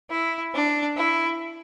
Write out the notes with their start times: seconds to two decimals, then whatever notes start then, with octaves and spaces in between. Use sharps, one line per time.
0.11 E4
0.54 D4
0.97 E4